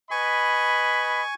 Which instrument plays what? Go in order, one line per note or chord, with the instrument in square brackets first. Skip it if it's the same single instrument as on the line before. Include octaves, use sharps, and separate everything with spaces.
[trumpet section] B4 D#5 B5 [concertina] G#5 C#6